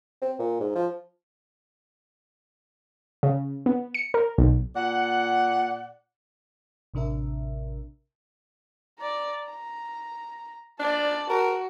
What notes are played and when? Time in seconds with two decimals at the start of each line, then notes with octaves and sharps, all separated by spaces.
0.22 C4
0.39 A#2
0.60 G#2
0.75 F3
3.23 C#3
3.66 B3
3.94 C#7
4.14 A#4
4.38 B1
4.76 A#2 D5 F#5
6.94 A1 C3 D4 A#4 E5
8.99 D5 A#5
9.46 A#5
10.80 D4 D5 A5
11.30 F#4 A#4